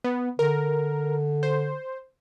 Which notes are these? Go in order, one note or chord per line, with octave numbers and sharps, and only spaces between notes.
B3
D3 A#4
C5